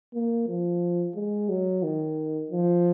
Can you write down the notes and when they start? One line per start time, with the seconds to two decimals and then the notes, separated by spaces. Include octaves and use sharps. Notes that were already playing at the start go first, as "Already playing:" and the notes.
0.14 A#3
0.48 F3
1.15 G#3
1.49 F#3
1.83 D#3
2.51 F3